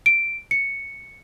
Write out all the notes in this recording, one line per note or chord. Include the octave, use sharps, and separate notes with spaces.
D7
C#7